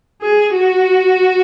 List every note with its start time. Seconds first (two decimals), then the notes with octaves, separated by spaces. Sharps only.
0.21 G#4
0.53 F#4